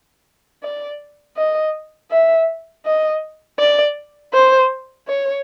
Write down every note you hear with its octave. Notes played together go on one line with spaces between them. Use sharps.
D5
D#5
E5
D#5
D5
C5
C#5